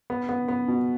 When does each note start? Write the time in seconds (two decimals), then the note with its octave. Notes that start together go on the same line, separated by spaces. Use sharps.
0.10 B3
0.29 B3
0.48 B3
0.68 B2